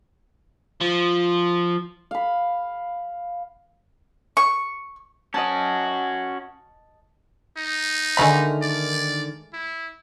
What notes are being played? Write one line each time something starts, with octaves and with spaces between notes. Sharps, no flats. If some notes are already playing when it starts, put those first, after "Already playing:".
F3
F5 B5
C#6
C#4 F#4 D#5 A5
D#4
D3 D#3 G#3 A3 B5 F6
D5
E4